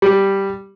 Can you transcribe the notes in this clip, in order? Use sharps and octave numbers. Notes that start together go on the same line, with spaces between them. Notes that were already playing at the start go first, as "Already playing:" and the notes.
G3